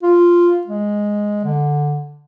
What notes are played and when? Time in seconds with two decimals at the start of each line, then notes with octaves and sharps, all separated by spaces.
0.03 F4
0.67 G#3
1.44 D3